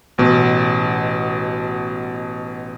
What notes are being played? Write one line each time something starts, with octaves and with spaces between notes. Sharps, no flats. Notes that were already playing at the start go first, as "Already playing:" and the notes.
A1 B2